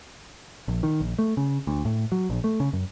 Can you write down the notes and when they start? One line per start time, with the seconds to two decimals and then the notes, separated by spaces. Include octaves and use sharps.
0.68 A#1
0.83 D#3
1.00 A#1
1.19 A3
1.37 C#3
1.67 D2
1.85 A2
2.12 F#3
2.30 A#1
2.44 A3
2.60 C#3
2.73 F#2